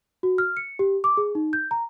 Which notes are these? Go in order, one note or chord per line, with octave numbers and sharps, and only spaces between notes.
F#4
F6
C#7
G4
D6
G#4
D#4
G6
A#5